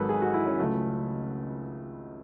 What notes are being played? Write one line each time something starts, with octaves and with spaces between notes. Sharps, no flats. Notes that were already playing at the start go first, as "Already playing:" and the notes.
Already playing: G#1 G#2 D#3 F#3 A4 B4
G#4
F#4
E4
C#4
C#2 C#3 F#3 A3